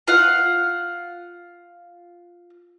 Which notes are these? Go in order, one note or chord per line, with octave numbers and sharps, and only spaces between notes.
F4 F5 F#5